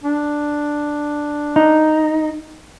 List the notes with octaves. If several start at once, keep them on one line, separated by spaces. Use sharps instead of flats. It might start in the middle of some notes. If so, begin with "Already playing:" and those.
D4
D#4